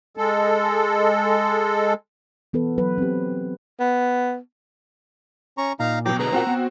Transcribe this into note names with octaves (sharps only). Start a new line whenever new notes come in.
G#3 A4
E3 B3 A4 B4
F#3 B4
C4 G4
B3
C#4 A#5 C#6
A#2 D#4 F5 A#5
B2 F#3 G5 D6
D3 G#4 B4 A#5
F#3 C4 F4 F#4 A#4 F#5
B3